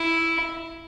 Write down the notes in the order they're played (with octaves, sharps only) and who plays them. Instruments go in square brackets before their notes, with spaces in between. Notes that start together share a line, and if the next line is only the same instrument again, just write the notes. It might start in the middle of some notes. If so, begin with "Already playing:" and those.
Already playing: [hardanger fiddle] E4